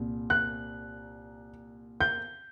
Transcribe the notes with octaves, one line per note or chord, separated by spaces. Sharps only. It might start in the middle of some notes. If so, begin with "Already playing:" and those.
Already playing: C2 A#2
F#6
G6